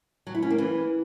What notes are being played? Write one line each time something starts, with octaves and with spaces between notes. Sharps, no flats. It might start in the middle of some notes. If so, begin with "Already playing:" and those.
F#3
E4
C#4
A#3
E3